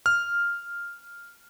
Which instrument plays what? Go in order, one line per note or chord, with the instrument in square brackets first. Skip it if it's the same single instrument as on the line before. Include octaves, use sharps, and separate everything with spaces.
[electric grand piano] F6